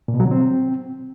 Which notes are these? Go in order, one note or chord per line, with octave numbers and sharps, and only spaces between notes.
A#2
B2
F#3
D3
C4